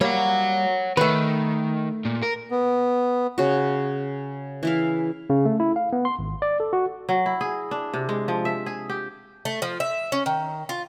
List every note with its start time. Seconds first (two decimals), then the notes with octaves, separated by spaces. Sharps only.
0.01 G3 A#3 C#5 F#5
0.97 D#3 A3 B4
2.05 A#2
2.22 A#4
2.51 B3
3.38 C#3 F#4
4.63 E3 E4 F5
5.30 C#3
5.45 A3
5.60 E4
5.76 F5
5.93 B3
6.05 C6
6.19 G#1
6.42 D5
6.60 A4
6.73 F#4
7.09 F#3
7.26 E4
7.41 G#4
7.71 D4
7.94 C3
8.09 G#3
8.28 F3
8.45 E5
8.66 G#4
8.89 G4
9.45 A3
9.62 F3
9.80 E5
10.12 C#4
10.26 D#3
10.69 F4